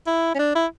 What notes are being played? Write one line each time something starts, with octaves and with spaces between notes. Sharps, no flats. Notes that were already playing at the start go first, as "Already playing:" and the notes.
E4
C#4
D4
E4